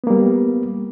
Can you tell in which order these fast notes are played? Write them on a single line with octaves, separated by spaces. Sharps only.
B3 A#3 G3